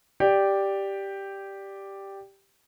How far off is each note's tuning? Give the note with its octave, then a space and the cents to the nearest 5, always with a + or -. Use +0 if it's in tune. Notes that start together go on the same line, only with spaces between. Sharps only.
G4 +0 D5 +0